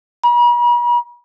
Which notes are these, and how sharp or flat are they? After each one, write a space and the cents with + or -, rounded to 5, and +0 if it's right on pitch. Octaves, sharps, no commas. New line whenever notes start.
B5 -45